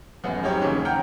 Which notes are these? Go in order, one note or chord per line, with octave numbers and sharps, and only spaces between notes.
D#1 F#2 B3 F#5
F#3 G3 C4 D#4 G4 C#5
D#2 C#3 E3 G#4
F#5 G5 A#5 F6 G6